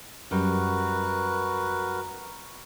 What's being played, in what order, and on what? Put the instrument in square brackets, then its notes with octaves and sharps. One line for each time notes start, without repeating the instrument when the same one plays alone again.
[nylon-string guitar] F#2 G3 [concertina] F#4 A#4 B4